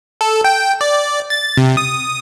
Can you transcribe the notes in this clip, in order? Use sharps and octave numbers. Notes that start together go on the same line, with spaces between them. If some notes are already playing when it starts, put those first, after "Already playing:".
A4
G5
D5
A6
C3
D#6